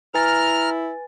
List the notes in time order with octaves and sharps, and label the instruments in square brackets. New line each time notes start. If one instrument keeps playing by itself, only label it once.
[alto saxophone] E4 [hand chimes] B4 G#5 A6 [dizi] A#5 [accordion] F6